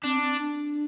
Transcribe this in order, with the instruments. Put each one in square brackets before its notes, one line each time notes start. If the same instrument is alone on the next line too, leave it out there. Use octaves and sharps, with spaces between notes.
[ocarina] C4 [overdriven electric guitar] D4
[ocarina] C4
D4